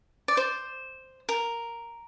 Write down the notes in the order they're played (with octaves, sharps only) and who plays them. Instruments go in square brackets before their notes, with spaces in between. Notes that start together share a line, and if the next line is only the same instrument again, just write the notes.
[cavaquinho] D5
C5
A#4